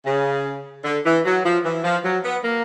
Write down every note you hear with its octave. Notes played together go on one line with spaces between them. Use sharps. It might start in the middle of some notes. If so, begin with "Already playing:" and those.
C#3
D3
E3
F#3
F3
E3
F3
F#3
B3
A#3